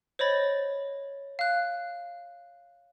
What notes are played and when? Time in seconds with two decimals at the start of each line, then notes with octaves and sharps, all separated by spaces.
0.19 C5 C#5 D#5 B5 A6
1.39 F5 F#6